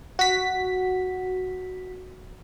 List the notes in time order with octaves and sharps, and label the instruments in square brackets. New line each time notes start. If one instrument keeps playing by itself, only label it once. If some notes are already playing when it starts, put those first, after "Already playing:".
[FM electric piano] F#4 B6